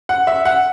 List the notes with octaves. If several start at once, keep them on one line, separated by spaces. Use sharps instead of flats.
F#5
E5
F#5